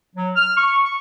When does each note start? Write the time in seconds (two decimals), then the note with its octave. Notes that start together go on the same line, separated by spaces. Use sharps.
0.15 F#3
0.36 F6
0.56 C#6
0.84 C#6